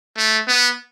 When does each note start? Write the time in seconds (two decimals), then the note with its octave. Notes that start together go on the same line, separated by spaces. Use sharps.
0.17 A3
0.48 B3